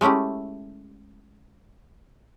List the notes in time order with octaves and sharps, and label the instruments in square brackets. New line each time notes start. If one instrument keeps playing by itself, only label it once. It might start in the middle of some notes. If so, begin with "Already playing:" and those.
[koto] G#3 A3 C#4 E4 G4